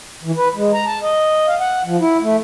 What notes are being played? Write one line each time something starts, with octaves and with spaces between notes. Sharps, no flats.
E3
B4
G#3
A#5
A5
D#5
F5
F#5
F3
E4
A3